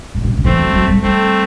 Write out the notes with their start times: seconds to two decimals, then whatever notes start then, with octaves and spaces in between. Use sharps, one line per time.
0.15 A2
0.22 B2
0.30 C3
0.37 D3
0.44 E3 A3 C4
0.59 F#3
0.73 F#3
0.88 G3
1.02 G3 A3 C4